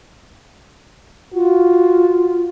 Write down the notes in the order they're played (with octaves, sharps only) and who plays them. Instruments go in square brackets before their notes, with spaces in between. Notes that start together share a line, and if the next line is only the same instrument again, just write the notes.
[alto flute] F4 [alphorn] F#4